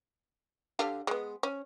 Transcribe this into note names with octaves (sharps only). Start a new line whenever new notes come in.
D3 G4 F5
G#3 B3
C#4